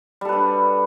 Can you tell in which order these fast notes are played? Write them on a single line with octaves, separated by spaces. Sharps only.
G3 A4 B4 D4